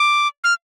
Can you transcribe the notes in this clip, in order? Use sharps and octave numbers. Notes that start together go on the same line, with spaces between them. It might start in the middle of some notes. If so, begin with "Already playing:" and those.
Already playing: D6
F6